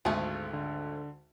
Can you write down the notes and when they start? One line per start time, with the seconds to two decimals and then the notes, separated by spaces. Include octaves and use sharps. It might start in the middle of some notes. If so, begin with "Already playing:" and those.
0.05 G#1 D2 A3 F4 G#4
0.53 D3